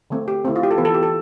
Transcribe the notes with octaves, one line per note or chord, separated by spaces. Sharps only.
D3 A3 C4
G4
D3 A3 C4 E4
F4
G4
A4
E3 B3 B4
A4
G4
A4